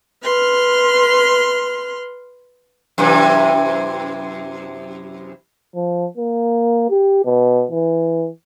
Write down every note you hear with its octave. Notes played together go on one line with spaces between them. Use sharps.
B4 C6 F6
F#2 C3 E3
F3
A#3
G4
B2
E3